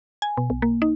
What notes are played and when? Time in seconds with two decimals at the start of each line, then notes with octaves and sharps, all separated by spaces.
0.22 G#5
0.37 B2
0.50 B1
0.62 A#3
0.82 D#4